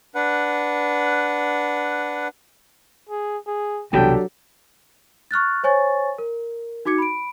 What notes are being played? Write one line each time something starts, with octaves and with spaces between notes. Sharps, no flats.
D4 B4 F#5
G#4
G#4
C2 B2 E3 F#3 D4 G4 A4 G5
C#6 F6 F#6 A6
C5 C#5 G#5 C#6 A6
A#4
D#4 F#4 D6 G#6 C#7
B5 D7